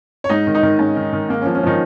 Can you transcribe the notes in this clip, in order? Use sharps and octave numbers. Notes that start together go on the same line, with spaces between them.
C#5
G#2 D#4 D#5
D#3
D#4 D#5
D#3
G#2 C#4
D#3
D#3
G#2 A#3
F3 C#4
C#4
D#3 F3 D#4